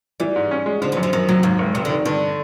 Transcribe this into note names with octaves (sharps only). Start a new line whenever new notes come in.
E3 G3
G#2
C#4
G#3
D3 F3
E3
F#2
F3
F#2 D#3
C3 F#3
D#2 G#2
F1
F1 C3
D3
D#3
G2 D3